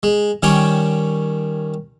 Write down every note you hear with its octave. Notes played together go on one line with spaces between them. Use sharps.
G#3
D#3 G3 C#4 C#5 G5